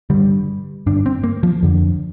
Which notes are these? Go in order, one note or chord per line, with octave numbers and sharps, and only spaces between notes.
G2 D3 G3
G2 D3 D4
C4
A#3
F3
F2 D3